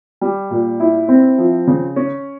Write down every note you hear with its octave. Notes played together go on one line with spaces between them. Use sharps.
G3
A#2
E4
C4
F3
C#3
C#4